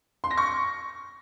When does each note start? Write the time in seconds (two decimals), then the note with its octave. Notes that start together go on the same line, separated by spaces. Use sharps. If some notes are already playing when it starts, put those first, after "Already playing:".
0.24 C6
0.31 A#6
0.38 C#6